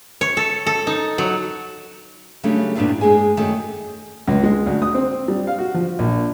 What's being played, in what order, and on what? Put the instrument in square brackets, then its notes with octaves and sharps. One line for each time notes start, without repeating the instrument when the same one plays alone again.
[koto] C#5
A4
A4
D#4
F#3
[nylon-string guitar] C#3 F#3 G3 A3 C#4 D4
E2 G2 A#2 G3 B3 D4
G2 G#3 G#4 G#5
F#2 D#3 F#3 A3
[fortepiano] C#2
G#3
D2
D#6
C4
G3
F5
F#4
F3
A#1